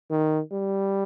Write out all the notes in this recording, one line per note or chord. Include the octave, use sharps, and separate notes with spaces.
D#3
G3